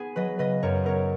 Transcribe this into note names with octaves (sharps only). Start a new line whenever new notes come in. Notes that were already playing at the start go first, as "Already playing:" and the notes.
Already playing: B3 G#4
F#3 B4 D#5
C#3 B4 D#5
F#2 A#4 C#5
B3 A#4 C#5